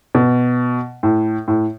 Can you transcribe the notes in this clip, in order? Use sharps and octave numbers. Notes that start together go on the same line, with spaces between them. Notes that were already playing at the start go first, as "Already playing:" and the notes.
B2
A2
A2